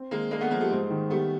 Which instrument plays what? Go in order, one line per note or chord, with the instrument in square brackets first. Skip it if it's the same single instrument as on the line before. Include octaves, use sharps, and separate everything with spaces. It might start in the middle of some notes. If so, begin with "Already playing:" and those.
Already playing: [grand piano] C4
[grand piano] D#3 [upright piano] G#3 A#3
[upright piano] G#3 A#3 [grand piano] D4
[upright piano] A3 B3
[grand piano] F3 [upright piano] G#3 A#3
[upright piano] G3 A3
[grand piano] G#2
D#3
[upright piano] G3 A3 [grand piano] B3